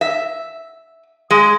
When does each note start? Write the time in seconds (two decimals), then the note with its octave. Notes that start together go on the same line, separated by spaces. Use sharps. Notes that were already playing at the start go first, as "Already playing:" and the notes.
0.01 E5
1.31 G#3